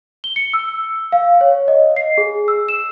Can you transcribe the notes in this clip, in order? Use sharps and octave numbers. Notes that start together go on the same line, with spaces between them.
G7
C#7
E6
F5
C#5
D#5
C7
G#4
E6
E7